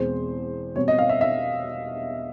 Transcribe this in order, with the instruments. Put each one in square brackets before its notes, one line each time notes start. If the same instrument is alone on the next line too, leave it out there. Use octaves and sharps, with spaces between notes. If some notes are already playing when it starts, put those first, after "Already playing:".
Already playing: [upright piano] E2 B2 G#3 C4 C5
B2 G3 C4 C#5
D#5
F5
E5
E5